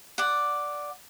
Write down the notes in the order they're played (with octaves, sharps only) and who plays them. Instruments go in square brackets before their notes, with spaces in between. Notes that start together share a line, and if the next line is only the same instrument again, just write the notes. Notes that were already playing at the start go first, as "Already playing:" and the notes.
[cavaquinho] D5 F#5